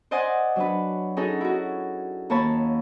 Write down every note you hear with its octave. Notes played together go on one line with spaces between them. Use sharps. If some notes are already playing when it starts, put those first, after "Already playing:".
C5 D5 D#5 F#5 G#5 C6
F#3 D4 B4
C#4 D#4 F#4 G#4 A4
E4 F#4
D#2 A#3 C#5 A5 B5